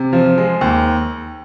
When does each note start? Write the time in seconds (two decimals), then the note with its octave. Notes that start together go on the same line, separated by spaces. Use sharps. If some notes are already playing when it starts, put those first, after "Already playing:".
Already playing: C3
0.13 F3
0.38 G#3
0.61 D#2